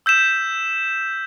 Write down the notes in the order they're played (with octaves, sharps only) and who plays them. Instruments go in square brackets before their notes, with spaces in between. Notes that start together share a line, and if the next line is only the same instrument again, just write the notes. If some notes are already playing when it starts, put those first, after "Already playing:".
[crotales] E6 G6 B6 E7